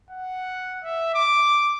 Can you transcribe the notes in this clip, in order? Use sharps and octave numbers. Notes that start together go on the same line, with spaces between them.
F#5
E5
D6